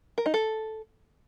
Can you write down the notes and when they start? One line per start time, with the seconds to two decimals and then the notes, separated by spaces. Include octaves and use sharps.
0.18 A#4
0.26 D#4
0.34 A4